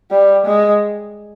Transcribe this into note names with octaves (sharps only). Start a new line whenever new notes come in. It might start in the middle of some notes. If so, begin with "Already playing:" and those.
G3
G#3